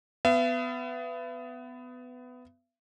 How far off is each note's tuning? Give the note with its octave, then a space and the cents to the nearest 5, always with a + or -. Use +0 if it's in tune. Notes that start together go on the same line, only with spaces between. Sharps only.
B3 +20 E5 +45